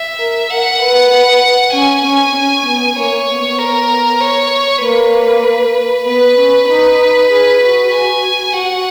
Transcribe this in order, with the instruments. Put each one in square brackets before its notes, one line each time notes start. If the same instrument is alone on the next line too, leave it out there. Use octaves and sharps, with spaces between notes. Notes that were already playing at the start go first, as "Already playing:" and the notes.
Already playing: [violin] E5
[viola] A#4
[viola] A#4 [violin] F#5
[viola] B4
[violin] F#5
[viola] C#4 [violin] G#5
[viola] C#4
C#4
B3
[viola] A#3 [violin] C#5
[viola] B3
[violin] A#4
C#5
[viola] A#3 [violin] B4
[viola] B3 [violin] B4
[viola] C#4
[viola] D#4 [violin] B4
[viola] G#4
F#4
[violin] G#5
[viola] F#4 [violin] F#5